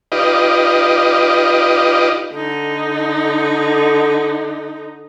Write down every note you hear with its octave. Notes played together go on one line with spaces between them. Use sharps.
D#4 F4 G4 B4 D5 D#5
D3 D#4